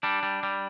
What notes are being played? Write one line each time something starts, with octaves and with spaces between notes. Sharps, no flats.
G3 D4
G3
G3